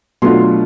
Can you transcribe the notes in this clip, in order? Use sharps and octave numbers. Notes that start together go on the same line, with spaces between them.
B2 F#3 A3 D4 F4 C6